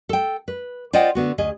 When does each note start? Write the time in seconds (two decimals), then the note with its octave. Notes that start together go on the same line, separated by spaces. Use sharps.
0.09 A4 G5
0.48 B4
0.93 F4 C5 D5 D#5 F#5 G5
1.15 D3 B3 F#4
1.38 D2 G#4 D#5